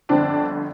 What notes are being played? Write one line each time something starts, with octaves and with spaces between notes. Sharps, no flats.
G1 F2 D3 C4 D4